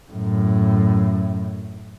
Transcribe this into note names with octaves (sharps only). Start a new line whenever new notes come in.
F#2 A2